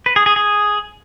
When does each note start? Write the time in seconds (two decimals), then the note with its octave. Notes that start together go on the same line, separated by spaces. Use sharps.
0.06 B4
0.16 G#4
0.26 G#4
0.36 G#4